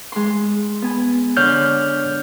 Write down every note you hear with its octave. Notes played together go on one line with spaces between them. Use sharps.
G#3 C6
B3 G#5
D3 C#5 F6 G6